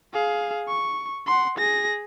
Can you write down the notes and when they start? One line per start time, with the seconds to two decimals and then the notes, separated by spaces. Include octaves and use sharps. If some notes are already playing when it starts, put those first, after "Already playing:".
0.14 G#4 F5
0.68 C#6
1.26 F#5 C6
1.58 G#4 A#6